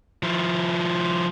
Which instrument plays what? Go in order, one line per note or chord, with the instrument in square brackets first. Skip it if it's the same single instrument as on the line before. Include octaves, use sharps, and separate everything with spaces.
[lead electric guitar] F3 E4